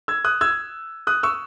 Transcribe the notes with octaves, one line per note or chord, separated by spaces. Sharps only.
E6 G#6
D#6 F#6
E6 G#6
D#6 F#6
C#6 E6